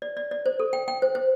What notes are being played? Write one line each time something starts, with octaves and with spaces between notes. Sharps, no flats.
D5
D5
D5
C5
A4
G5
G5
C5
C5